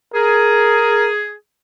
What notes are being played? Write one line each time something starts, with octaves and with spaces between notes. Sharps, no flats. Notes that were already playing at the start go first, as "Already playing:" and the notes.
G#4 A#4